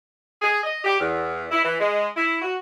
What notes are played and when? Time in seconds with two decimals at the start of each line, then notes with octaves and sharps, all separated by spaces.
0.42 G#4
0.63 D#5
0.85 G4
1.00 E2
1.51 E4
1.64 E3
1.80 G#3
2.16 E4
2.42 F#4